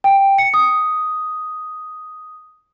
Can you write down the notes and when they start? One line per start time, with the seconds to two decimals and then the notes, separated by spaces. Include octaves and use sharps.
0.04 G5
0.38 C#7
0.54 D#6